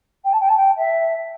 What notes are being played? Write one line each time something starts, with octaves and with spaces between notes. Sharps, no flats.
G5
A5
G5
A5
G5
E5